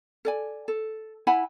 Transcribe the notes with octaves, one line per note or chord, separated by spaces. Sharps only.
A4 D5 G#5
A4
E4 F#5 G#5 B5